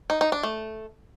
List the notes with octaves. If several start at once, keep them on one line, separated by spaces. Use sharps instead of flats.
D#4
D#4
D4
A3